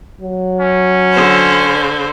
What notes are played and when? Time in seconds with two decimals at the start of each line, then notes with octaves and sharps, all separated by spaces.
0.21 F#3
0.60 C#4
1.12 D3 C5